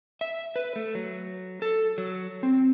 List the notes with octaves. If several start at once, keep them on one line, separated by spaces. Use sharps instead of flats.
E5
B4
A3
F#3
A4
F#3
C4